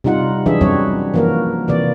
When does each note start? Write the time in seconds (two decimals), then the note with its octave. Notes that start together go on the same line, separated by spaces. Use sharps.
0.04 C3 G3 D#4 F4 F#5
0.46 E3 F#3 D4 G#4 E5
0.61 F#3 G3 C4 C#4 F#4 C#5
1.14 E3 F3 A#3 F#4 A#4
1.68 C3 E3 A#3 D5